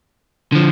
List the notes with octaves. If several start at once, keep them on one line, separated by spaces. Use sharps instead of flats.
D3 F3